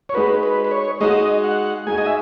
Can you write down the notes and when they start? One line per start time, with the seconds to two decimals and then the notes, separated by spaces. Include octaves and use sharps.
0.09 C#5
0.14 G#3 D#4 F#4 B4
0.43 B4
0.64 B4
0.71 C#5
1.01 G#3 D#4 F#4 D#5
1.44 F#5
1.87 G#3 D#4 F#4 G#5
1.98 D#5
2.06 E5